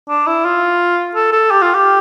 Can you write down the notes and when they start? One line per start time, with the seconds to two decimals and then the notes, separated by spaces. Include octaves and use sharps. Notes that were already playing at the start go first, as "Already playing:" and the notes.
0.08 D4
0.27 E4
0.45 F4
1.15 A4
1.33 A4
1.51 G4
1.62 F4
1.74 G4